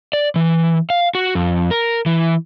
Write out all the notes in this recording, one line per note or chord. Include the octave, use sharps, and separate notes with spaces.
D5
E3
F5
F#4
F2
A#4
E3